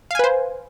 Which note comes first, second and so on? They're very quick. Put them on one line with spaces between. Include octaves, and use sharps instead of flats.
F5 G#5 B4 C5